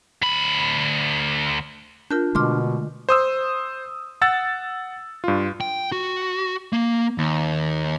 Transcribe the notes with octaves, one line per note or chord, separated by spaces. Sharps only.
D2 B5
D4 F4 A#4 G6
B2 D3 G#3 A3 C6 D6 F6
C5 D#6 E6
F#5 E6 A6
G2 F4
G5
F#4
A#3
D#2